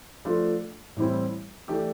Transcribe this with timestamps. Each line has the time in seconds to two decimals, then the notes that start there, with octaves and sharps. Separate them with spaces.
0.25 F3 A3 D4 F4
0.96 A2 E3 G3 C4 E4
1.68 E3 A3 D4 G4